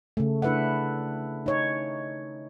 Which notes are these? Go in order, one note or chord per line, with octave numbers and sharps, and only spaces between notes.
C#3 A3
D4 E4 B4 E5 F#5
D#4 C#5